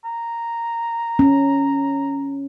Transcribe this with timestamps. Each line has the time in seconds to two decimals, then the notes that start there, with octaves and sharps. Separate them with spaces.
0.05 A#5
1.19 C#4